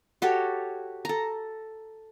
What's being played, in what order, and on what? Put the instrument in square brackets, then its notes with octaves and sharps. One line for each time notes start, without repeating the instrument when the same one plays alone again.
[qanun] F#4 G4 A4 C#5
A4 A#5